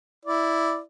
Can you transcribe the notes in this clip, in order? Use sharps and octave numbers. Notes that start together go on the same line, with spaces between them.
E4 D5